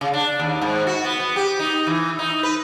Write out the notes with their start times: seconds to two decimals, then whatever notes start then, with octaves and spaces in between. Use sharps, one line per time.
0.01 C#3
0.13 D4
0.39 D#2
0.61 G#2
0.87 F#4
1.04 B3
1.20 B3
1.36 G4
1.59 D#4
1.87 E3
2.19 D#4
2.43 B4